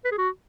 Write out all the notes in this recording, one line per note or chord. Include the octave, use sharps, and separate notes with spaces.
B4
G#4
F#4